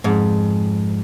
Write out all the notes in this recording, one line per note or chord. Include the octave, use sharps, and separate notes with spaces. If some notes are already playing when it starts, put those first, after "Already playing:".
F2 G#2